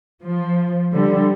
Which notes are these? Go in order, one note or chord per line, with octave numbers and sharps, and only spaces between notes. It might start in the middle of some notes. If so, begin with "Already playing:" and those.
F3
D3 G3